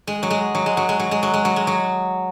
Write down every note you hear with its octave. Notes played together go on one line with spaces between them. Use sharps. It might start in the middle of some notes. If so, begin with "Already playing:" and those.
G#3
F#3
G#3
F#3
G#3
F#3
G#3
F#3
G#3
F#3
G#3
F#3
G#3
F#3